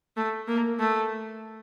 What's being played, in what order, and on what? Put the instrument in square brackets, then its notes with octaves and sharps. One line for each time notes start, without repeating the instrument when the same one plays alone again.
[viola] A3
A#3
A3